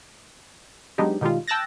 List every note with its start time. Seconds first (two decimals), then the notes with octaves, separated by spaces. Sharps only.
0.98 F#3 G#3 B3 D4 D#4 G4
1.21 B2 D#3 G3 G#3 F4
1.48 G5 A5 E6 F#6 A6 A#6